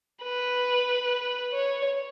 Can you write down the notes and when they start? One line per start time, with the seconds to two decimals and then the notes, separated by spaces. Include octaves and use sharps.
0.23 B4
1.54 C#5